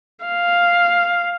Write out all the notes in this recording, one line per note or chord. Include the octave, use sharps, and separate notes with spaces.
F5